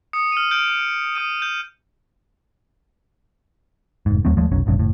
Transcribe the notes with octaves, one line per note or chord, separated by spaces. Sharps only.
D#6 C#7
F6 D#7
F6 G6 D7
D#6 G6 D#7
G6 D#7
F1 G#2
D#2 F#3 A3 C4
D#2 F3 G#3 A3
F1 B1 F#3 C#4
E1 A1 G2 C#3
F#1 A2